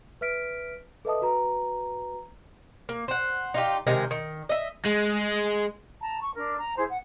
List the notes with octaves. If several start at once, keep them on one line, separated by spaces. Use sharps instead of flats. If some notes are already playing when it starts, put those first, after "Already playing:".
B4 E5 F6 B6 D7
A4 B4 D#5 E5 A5 D#6
F#4 B4 A#5
A#3
C5 F#5
D#4 F4 G4
C3 D#3 G#3 A#4
D#3
D#5 E5
G#3
A5 A#5
C#6
D4 A#4
A#5
E4 G#4 C5
F#5